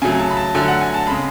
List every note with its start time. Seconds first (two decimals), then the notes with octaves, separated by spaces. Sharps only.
0.02 C#3 F#3 A3 G#5
0.12 G#5
0.19 A5
0.30 B5
0.37 A5
0.54 D3 F#3 A3 G#5
0.68 F#5
0.81 G#5
0.94 A5
1.07 C#3 G#3 B5